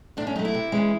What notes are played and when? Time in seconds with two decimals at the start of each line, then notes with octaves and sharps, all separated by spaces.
0.17 A2 D4
0.27 C#4
0.36 F#3 D#4
0.39 A3
0.45 E4
0.54 C3
0.72 E3 G#3 C#4